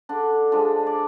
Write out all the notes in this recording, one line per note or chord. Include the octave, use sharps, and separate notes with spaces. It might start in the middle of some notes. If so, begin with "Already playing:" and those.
D3 D4
F3 G#3 D4
D5